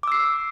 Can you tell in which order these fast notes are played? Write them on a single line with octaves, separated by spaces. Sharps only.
D6 E6 C7